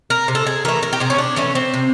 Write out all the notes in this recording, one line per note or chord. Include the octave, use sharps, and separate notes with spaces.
A#4
C3
A4
G#4
E3 A3 A#4
A#4
G4
C3 G#4
C#4
D4
E3 A3 C#4
C4
C3